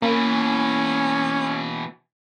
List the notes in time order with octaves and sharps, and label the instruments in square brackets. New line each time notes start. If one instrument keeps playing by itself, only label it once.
[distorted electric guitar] B2 E3 [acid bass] A#3 [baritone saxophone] C#4